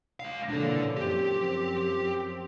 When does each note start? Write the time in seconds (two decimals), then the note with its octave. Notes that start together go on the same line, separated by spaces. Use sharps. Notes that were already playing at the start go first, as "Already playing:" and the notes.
0.20 G#3 F5
0.50 A#2 C#3 E3 D4 A4
0.97 F#2 F3 C4 G4